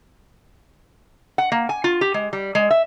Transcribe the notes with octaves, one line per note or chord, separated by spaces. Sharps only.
F#5
A#3
G#5
F4
G4
G#3
G3
G#3
E5